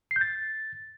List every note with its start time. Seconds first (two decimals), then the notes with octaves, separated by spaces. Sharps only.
0.11 C7
0.16 G6
0.21 A6